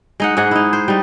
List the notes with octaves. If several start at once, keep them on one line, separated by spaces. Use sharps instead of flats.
G#3 D#4 F#5
G#2 G#3 G#4 F#5
D#4 E4
C5
G3 D#4